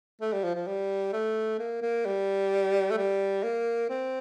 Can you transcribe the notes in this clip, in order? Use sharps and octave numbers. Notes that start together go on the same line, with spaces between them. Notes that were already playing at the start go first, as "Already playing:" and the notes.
A3
G3
F3
F3
G3
A3
A#3
A#3
G3
A3
G3
A#3
C4